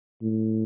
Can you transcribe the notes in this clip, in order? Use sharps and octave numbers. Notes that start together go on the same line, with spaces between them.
A2